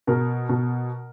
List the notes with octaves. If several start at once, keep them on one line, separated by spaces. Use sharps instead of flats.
B2 A#4
B2